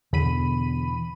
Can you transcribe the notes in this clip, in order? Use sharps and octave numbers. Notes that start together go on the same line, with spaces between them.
E2 B2 D3 B5 D#7